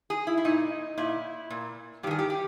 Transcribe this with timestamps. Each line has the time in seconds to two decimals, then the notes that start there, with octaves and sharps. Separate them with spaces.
0.10 G#4
0.27 E4
0.37 E4
0.45 A#2 D#4
0.98 A#2 E4
1.50 A#2
2.03 G2 G4
2.07 D#3 G#4
2.19 G4
2.30 G4